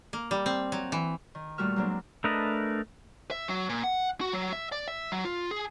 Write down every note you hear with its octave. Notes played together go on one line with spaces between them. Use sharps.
A#3
G3
C4
F#3
E3
D#3
A#2 G3 A3 F#4 E5 F6
F#3 G#3 A#3 C4 D4
A3 D4 A#4 B4 D#5
E5
F#3
A#2
F#5
F#4
F#3
E5
D5
E5
F#3
F4
G#4